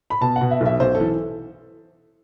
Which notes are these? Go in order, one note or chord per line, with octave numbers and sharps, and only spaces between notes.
B5
B2 A5
F#5
B2
E5
B1 E5
B1 C5
A4
E3